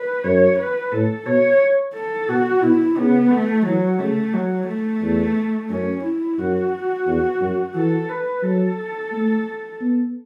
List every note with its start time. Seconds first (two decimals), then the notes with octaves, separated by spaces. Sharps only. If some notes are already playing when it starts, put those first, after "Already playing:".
Already playing: B4
0.24 F#2 C#5
0.58 B4
0.92 A2 A4
1.26 B2 C#5
1.94 A4
2.28 B2 F#4
2.62 B2 E4
2.97 C#3 B3
3.31 A3
3.65 E3 F#3
3.99 C#3 A3
4.33 F#3
4.68 A3
5.02 E2
5.70 F#2 C#4
6.04 E4
6.38 F#2 F#4
7.07 E2
7.40 F#2
7.75 E3 A4
8.09 B4
8.43 F#3 A4
9.12 A3
9.80 B3